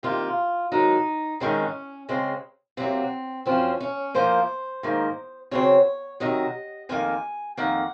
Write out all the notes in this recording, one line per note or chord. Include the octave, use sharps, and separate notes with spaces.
C3 D#3 A#3 F4
G#2 D#3 F#3 D#4
G#2 D#3 G#3 C4 C#4
C#3 G#3 C4
C3 F#3 A#3 C4
F#2 F3 C4 C#4
C#4
A#2 F3 A#3 C5
G#2 D#3 A#3
C#3 F#3 C4 C#5
C3 D#3 F#3 D#5
F2 D#3 A#3 G#5
F2 D#3 A#3 F#5